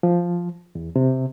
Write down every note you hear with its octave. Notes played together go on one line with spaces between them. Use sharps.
F3
E2
C3